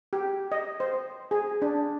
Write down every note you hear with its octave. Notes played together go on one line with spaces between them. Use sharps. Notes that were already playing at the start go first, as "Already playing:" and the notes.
G4
D#5
C5
G#4
D4